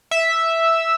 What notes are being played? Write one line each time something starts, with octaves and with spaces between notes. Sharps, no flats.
E5